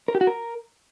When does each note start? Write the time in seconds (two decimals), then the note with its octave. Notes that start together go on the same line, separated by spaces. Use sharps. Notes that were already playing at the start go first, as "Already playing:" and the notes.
0.08 A#4
0.15 G4
0.21 F#4
0.27 A#4